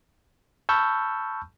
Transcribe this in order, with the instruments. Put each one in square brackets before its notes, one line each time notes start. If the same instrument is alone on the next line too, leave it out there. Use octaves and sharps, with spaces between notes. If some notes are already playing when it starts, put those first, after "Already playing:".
[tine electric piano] A5 B5 C#6 E6 F6 G6